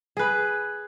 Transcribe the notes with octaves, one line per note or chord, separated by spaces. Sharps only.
G#4 B4